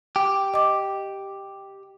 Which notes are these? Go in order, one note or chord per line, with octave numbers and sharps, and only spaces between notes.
G4
D#5 D6